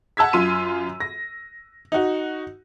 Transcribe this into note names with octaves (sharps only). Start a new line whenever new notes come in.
F#5 A5 E6 G#6 B6
F#2 F4 C6 D#7
A#6
D#4 F#4